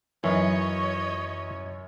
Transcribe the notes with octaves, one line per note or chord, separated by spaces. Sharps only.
F#2 E3 C#4 D#4 C#5 D#5